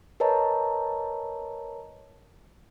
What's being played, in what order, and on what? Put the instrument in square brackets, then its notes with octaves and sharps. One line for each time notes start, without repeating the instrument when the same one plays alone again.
[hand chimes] A#4 B4 C#5 D#5 A5 A#5